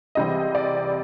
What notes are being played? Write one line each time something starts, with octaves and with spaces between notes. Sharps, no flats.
C#2 C3 E3 G3 C4 D#5
D5